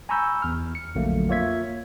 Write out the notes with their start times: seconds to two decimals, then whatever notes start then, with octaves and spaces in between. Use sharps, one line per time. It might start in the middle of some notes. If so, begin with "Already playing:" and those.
0.09 G#5 A#5 B5 C#6 E6 G6
0.42 E2 F6
0.75 C#7
0.95 A#1 F2 D3 F#3 A3 A#3
1.29 A#3 F4 C#5 E5 G#6 B6